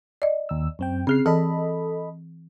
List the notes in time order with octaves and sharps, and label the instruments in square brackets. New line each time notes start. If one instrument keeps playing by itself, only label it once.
[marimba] D5 D#5
[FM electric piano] D#2 E6
F#2 C4 G5
[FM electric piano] C#3 F6 C7 [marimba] C4 G#4
[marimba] E3 A5 [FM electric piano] A4 D#5 B5